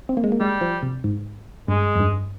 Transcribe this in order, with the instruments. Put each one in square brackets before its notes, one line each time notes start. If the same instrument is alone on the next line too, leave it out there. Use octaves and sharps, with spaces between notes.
[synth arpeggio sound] C4
A#3
G#3
A#3
[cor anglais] G3 [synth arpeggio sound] G#3
[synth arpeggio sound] F3
C3
G#2
[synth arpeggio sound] G2 [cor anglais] G#3
[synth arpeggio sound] F2
G2